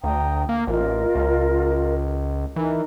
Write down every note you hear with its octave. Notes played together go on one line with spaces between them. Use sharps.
D2 G5 A#5 D#6
A#3
A1 F4 A#4 D#5
C#2
E3 D#4 A#4